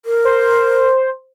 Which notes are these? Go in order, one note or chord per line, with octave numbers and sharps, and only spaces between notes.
A#4
C5